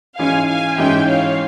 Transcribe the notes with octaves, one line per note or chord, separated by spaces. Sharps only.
G#2 E3 G#3 C#4 F5 G#5
F5 G#5
G#2 E3 G#3 C#4 E5 G5
C#5 F5